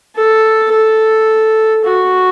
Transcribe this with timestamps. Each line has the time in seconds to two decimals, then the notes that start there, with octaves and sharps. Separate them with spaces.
0.16 A4
0.72 A4
1.85 F#4